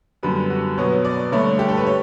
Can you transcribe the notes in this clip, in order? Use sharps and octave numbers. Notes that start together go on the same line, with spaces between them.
F#2 D3 G3 B3 B4
F#4
B2 F#3 B3 C#5
D5
G2 D3 A3 C#5
G4
A4
B4
C#5